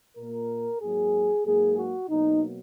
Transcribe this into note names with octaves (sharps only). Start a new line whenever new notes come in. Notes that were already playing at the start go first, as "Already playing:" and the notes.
A#2 A#3 A#4
G#2 F#3 A#3 G#4
G#2 F#3 A#3 G#4
F#4
B2 F#3 A#3 D#4